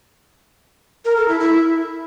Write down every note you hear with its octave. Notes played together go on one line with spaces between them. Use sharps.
A#4
A4
E4
E4